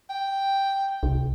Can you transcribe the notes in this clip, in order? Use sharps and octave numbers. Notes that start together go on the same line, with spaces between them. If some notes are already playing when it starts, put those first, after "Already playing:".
G5
C2